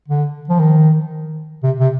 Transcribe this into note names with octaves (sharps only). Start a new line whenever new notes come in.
D3
F3
D#3
C3
C3